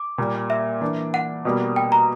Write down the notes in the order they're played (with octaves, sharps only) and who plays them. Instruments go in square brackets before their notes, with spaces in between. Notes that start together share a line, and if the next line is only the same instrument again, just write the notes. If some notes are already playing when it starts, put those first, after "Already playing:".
Already playing: [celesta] D6
[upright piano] A#2 G3 A#3
[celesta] E5
[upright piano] E3 A#3 D4
[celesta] F#5
[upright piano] B2 G3 A#3
[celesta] G5
A#5